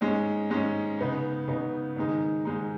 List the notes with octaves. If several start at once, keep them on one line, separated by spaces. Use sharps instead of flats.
G#2 G#3 C#4
G#2 G#3 C#4
C#3 B3 D#4
C#3 B3 D#4
G#2 D#3 G#3 D#4
G#2 D#3 G#3 D#4